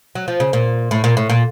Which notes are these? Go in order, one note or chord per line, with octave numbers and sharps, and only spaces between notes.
F#3
F3
C#3
A#2
A2
A#2
A2
A#2